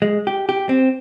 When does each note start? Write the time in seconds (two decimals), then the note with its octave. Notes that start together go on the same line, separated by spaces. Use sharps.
0.02 G#3
0.27 G4
0.49 G4
0.69 C4